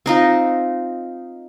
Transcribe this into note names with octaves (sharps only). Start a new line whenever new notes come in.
C4 D#4 F4